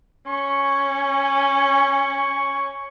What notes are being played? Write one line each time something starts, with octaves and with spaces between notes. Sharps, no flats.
C#4 C#6